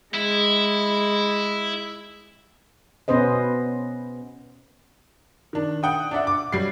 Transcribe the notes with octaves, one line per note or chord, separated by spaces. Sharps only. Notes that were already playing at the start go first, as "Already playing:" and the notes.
G#3 E4
B2 B3 C#4 B4 C5 D#5
D#3 D4
F#5 G5 D#6
D4 D5 E5 F#5
D6
F#3 G3 C7